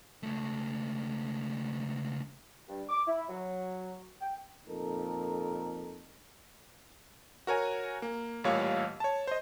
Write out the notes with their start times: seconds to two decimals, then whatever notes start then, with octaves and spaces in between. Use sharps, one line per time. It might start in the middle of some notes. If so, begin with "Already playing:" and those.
0.23 C#2 A3
2.69 G2
2.89 D6
3.07 E4
3.29 F#3
4.21 G5
4.68 F2 A#2 D#4 A4 A#4
7.47 F#4 A#4 C#5 G#5
8.02 A#3
8.44 A1 A#2 G3 C#5 F5 C#6
9.00 C#5 A5
9.27 C5 D#5